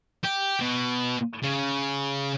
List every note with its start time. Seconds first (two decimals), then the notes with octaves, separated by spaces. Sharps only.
0.24 G4
0.60 B2
1.43 C#3